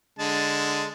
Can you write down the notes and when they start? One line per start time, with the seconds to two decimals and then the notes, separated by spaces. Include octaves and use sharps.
0.19 D3 G#3 A5